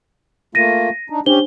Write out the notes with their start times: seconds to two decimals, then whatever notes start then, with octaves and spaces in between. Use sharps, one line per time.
0.55 A3 A#3 F4 A#6 D#7
1.10 D4 D#4
1.26 C#4 D4 G4 C5 G7